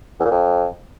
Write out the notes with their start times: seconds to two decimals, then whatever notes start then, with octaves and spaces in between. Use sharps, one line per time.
0.20 E2
0.25 A#2
0.31 F2